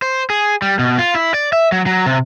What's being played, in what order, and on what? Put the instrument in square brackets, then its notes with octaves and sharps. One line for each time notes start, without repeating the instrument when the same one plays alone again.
[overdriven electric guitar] C5
G#4
G3
B2
F4
E4
D5
E5
F#3
F#3
C3